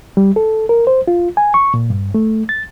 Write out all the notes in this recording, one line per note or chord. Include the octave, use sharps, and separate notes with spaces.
G3
A4
A#4
C5
F4
G#5
C#6
A#2
G2
A3
A6